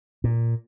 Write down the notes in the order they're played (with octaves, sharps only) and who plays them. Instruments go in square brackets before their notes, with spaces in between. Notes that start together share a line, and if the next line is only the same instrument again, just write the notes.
[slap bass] A#2